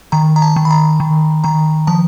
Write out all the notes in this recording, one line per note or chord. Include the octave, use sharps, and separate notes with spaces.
D#3 A#5
A#5
A5
D#3
B5
A#5
D#3
D#3 A#5
F3 A5